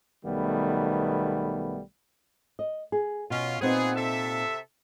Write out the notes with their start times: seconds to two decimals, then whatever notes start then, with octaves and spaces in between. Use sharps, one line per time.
0.25 B1 D#3 G3 A3 B3
2.59 D#5
2.92 G#4
3.30 B2 C#4 F4
3.61 A#2 B3 C4 D#4 G#4
3.96 C3 A4 E5